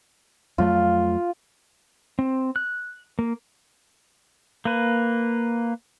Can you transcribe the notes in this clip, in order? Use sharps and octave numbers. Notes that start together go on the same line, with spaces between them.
F2 F#3 A3 F4
C4
F#6
A#3
A#3 B4